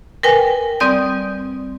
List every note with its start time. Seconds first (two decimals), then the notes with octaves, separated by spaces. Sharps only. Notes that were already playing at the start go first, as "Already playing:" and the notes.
0.23 A#4 B4 G5 G#5
0.80 G3 C4 D5 D#6 G6